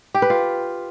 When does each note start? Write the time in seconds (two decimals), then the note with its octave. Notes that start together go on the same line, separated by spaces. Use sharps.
0.14 G4
0.22 B4
0.30 F4